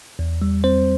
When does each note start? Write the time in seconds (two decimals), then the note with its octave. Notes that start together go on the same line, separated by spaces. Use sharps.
0.19 E2
0.42 G3
0.64 C4 C5